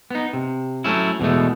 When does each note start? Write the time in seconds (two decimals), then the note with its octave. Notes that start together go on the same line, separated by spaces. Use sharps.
0.11 B3 D#4
0.33 C3
0.84 F#3 A3 C#4 E4
1.20 E2 B2 G#3 A3